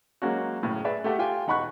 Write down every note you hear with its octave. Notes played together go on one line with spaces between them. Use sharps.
F#3 G#3 A#3 C#4 F#4
F#1 A2 C#3
G#4 B4 D5 E5
A3 G4 E5 F#5
F4 G4 G5 G#5
E1 D#4 F#5 B5 C#6 F#6